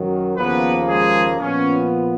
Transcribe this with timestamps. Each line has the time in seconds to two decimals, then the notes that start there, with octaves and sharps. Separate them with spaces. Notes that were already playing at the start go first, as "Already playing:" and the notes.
Already playing: F#2 D#3 F#3
0.37 D#2 C#3 F3 A#3 B3 B4
0.89 G#3 G#4
1.40 A#2 F3 B3 C#4